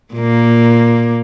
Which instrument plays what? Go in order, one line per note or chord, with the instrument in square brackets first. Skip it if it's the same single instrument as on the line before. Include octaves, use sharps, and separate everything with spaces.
[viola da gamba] A#2 A#3